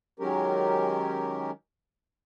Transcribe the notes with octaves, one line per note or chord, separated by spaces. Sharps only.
D#3 F#3 G#3 C#4 G4 A#4